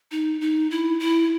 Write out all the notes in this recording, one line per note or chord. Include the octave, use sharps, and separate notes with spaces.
D#4
D#4
E4
E4